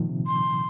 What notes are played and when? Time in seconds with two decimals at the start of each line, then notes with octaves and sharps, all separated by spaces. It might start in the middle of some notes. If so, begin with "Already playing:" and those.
Already playing: A#2 D#3 F3
0.09 C3
0.27 C6